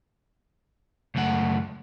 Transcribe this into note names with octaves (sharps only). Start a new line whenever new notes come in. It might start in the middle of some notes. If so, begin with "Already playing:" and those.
C#2 F#2 A3 F#5